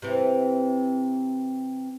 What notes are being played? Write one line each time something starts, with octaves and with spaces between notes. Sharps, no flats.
C3 E3 C4